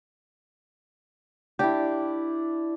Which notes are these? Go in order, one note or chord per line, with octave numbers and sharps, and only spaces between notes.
D4 E4 G4